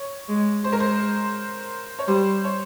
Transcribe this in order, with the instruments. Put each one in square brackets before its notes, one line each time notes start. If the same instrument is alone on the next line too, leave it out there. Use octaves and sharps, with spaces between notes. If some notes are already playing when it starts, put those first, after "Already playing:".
Already playing: [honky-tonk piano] C#5
[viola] G#3
[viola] G#3 [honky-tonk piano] C5
[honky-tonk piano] A#4
C5
C#5
[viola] G3 [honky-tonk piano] C5
[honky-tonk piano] C#5